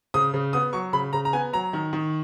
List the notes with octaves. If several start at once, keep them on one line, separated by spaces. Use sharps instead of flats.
C#3 D#6
C#3
B3 D#6
F#3 C#6
C#3 B5
C#3 A#5
A#5
B3 G#5
F#3 A#5
D#3
D#3